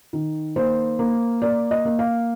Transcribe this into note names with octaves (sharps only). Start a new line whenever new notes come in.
D#3
A#3 C5
A#3
A#3 D5
D#5
A#3
F5